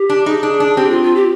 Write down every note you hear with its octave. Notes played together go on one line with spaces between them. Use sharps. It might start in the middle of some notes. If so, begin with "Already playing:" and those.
Already playing: G4
D4
D#4 G#4
D4
D4
C4 G4
F4
F4
G4